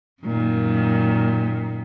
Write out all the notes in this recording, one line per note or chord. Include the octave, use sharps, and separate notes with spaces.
F#2 A#2 D#3